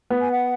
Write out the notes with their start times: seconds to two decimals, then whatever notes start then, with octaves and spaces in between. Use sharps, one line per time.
0.10 B3
0.21 G#5
0.32 F#5